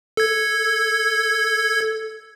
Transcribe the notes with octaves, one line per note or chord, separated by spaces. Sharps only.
A4 G#6